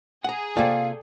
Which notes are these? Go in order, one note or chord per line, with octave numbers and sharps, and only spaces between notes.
G#4 F#5 A#5
C3 A#3 F4 A4 D5 F5 G5